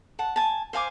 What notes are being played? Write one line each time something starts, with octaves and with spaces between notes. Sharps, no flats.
F#5 A5
G#5 A5
C5 F5 G#5 D6